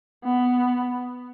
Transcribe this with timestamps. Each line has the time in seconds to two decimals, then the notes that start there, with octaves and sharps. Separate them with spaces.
0.25 B3